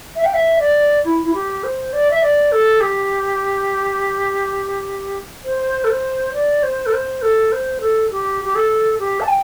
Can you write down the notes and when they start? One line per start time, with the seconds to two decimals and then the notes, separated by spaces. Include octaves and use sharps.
0.16 E5
0.24 G5
0.34 E5
0.59 D5
1.05 E4
1.24 E4
1.34 G4
1.63 C5
1.93 D5
2.11 E5
2.22 D5
2.52 A4
2.80 G4
5.45 C5
5.84 A4
5.90 C5
6.34 D5
6.63 C5
6.86 A4
6.93 C5
7.22 A4
7.52 C5
7.81 A4
8.11 G4
8.45 G4
8.55 A4
8.99 G4
9.20 A5
9.28 G5